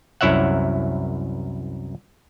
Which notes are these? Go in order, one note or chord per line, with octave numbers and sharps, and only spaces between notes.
C2 F#2 E4 C#5 E5 F#5